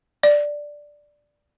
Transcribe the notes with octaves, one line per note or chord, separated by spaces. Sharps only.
D5